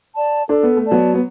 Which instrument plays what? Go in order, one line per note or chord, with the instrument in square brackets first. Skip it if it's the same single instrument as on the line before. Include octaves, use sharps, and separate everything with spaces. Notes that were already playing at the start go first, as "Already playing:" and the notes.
[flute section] D5 A5
[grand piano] D4 [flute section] A4
[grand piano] B3
A3
[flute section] D5 A5
[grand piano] F#3 B3
B3